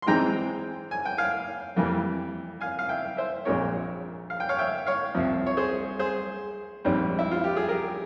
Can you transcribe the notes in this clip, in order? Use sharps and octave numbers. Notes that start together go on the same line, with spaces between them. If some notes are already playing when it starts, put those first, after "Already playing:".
C6
G#2 E3 G#3 C4 G5 A#5
G#5
G5
F5 G#5
F2 C3 E3 G3 A#3
F5 G#5
F5
E5 G5
C5 E5
A#1 A#2 G#3 C4 A#4 C#5
F5
G5
C#5 F5
E5 G5
C#5 F5
C2 C3 F3
C#5
G#4 C5
G#4 C5
A#1 G#2 G3 C4
E4
F4
G4
G#4
G4 A#4